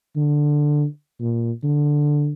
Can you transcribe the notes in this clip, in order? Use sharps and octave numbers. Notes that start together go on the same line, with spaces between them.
D3
A#2
D3